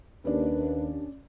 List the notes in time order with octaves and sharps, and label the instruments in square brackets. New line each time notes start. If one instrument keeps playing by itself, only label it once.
[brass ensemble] D#2 [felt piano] C#4 D5 [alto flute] D4 [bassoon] B4